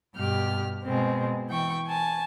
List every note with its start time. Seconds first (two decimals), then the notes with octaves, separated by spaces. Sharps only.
0.16 G2 B2 G4 F6
0.84 B2 G#3 C4
1.49 E3 G5 C#6
1.87 G#5 A5